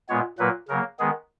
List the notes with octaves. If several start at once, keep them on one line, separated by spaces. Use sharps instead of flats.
A#2 G#3 B3 C#5
A#2 F#3 A#3 B4
C#3 F#3 A#3 A#4
D#3 G#3 B3 G#4